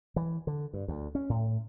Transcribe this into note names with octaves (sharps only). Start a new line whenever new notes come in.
E3
D3
G2
D2
C#4
A2